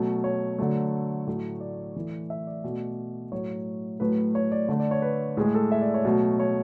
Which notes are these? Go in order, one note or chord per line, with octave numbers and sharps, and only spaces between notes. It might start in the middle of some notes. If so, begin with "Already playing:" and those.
Already playing: B2 F#3 A3
C#5
D3 F#3 A3
A2 F#3 A3
D5
A2 E3 A3
E5
D5
B2 A3
A2 F#3 A3 C#5
A2 F#3 A3 B4
C#5
D5
D3 A3
D5
C#5
B4
A2 G#3 G#4
A4
E5
D5
C#5
B2 F#3 A3
C#5